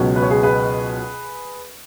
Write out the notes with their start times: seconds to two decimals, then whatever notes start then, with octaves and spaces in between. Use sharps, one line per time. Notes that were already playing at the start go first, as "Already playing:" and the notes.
Already playing: C#2 B2 F#3 C#4
0.16 B4
0.23 C#5
0.30 G#4 B4
0.43 G#4 B4